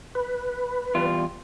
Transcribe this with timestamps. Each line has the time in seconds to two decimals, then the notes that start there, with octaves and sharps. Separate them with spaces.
0.15 B4
0.95 E2 G3 F4